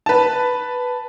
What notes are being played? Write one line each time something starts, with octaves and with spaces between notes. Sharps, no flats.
B4 A5